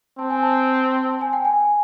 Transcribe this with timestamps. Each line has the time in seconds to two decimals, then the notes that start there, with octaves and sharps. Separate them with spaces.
0.18 C4 A5
0.30 G#5
0.43 A5
1.09 A5
1.21 G#5
1.33 G5
1.45 G#5